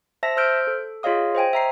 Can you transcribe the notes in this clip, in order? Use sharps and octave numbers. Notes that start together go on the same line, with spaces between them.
C5 E5 A5 A#6 B6
C5 E6 F6 G6 D7
A4
F4 G#4 C#5 D#5 F5 D#6
C5 D#5 G5 G#5
E5 A#5 C7